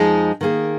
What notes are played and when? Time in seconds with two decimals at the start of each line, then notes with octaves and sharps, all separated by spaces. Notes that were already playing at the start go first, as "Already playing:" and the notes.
Already playing: F2 F3 G#3 D#4 G#4
0.41 D#3 A#3 G#4